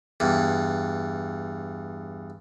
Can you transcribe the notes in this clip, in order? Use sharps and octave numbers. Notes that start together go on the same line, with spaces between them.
E2 G2